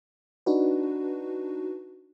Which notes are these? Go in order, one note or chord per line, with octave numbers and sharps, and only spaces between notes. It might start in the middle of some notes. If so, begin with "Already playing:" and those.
D4 D#4 F#4 B4